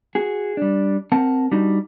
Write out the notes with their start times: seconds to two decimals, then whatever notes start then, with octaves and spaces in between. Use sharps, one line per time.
0.15 F#4 G#4
0.57 G3 D4
1.12 C4 A#4 F#5 A5
1.52 G3 D4 D#4 F#4